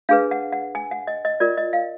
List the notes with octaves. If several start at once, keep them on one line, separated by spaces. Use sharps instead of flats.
D4 G#4 B4 F5
F#5
F#5
G#5
F#5
D#5
D#5
F4 A#4 D5
D#5
F5